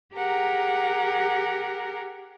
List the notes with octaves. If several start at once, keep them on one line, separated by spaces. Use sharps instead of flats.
G4 G#4 A#4 F#5 A#5